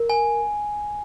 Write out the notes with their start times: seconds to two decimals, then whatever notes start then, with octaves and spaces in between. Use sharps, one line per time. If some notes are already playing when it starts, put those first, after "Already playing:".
Already playing: A#4
0.10 G#5